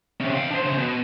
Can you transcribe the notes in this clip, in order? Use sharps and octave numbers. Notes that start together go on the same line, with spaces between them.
C3 C#4
F5 G5
D4 C5
C#3 C5
B2